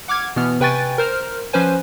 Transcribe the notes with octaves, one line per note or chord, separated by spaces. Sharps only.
F#5 D6 F6 G#6
B2 E3 B3 F6
C3 B4 G5 G#5 C#6 A6
A#4 C5 F6
F3 C#4 B4 C5 G#5